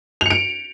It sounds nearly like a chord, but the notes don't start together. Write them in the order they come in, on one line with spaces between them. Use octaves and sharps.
F7 C#7 D7